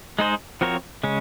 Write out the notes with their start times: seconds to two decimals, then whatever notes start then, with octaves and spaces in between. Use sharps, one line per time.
0.19 G#3 D#4 G#4 C5
0.61 F3 C4 F#4 A#4 C#5
1.03 C#3 G#3 C#4